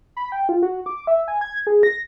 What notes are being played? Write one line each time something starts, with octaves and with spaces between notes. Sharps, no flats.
B5
G5
F4
F#4
D6
E5
G#5
G#6
G#4
A#6